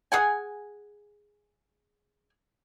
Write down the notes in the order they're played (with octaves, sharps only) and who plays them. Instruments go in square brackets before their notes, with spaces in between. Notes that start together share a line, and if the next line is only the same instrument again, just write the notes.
[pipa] G#4 F#5 G#5